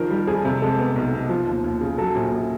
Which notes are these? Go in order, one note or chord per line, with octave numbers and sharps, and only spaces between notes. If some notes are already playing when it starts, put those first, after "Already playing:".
Already playing: D#3 F3 A#4
G3
F2 G#4
C3
G#3 A4
B3
B1
B2
F3
D#2
D#2
C#3
F#3 A4
A#1
A#1